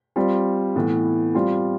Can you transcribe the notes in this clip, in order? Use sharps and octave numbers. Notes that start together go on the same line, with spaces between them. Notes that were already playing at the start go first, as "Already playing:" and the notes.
G3 C4 F4
A2 E3 B3
G3 C4 F4